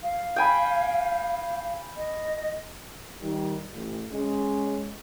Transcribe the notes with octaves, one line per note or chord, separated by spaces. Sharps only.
F5
G5 G#5 B5
D#5
D#3 G3
A1
G#3 C#4